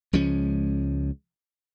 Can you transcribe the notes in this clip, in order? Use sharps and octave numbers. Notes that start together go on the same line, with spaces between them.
C#2 F3 G#3 C#4